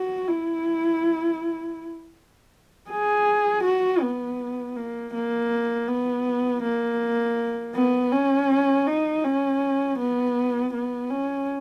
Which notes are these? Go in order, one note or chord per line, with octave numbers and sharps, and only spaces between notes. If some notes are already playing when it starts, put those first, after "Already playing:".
Already playing: F#4
E4
G#4
F#4
B3
A#3
A#3
B3
A#3
B3
C#4
D#4
C#4
B3
B3
C#4